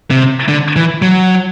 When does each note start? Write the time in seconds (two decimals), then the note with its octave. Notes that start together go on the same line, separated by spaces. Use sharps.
0.10 C3
0.49 D3
0.76 E3
1.02 F#3